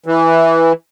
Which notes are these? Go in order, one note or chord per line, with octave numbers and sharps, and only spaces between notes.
E3